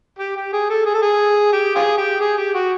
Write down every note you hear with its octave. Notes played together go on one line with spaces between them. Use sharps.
G4
G4
G#4
A4
G#4
A4
G#4
G4
F4 G#4
G4
G#4
G4
F#4